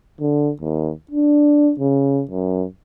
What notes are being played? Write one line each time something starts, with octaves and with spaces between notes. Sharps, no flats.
D3
D#2
D4
C#3
F#2